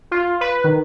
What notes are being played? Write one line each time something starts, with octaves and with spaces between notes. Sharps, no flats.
F4
B4
D#3